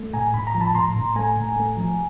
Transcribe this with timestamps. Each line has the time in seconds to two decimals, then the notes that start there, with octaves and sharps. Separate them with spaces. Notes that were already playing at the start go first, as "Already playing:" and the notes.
Already playing: A3
0.13 A2 G#5 A#5
0.34 A2 B5
0.47 A#5
0.55 F3
0.61 A5 B5
0.75 A2 A#5 C6
0.96 A2
1.16 A3 G#5 A#5
1.36 A2
1.56 A3
1.77 F3